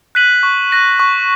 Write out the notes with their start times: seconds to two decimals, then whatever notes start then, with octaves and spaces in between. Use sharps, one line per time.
0.15 F#6 B6 D#7 F#7
0.43 C#6
0.72 F#6 A#6 D#7
1.00 C#6